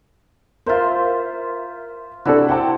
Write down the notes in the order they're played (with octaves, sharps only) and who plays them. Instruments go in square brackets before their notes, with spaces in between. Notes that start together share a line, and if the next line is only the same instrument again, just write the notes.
[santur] F4 C5 [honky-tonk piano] A#4 E5
[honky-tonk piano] C3 D4 A4 [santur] E4 F#4
[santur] C4 G4 [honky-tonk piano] F#5 G5 A5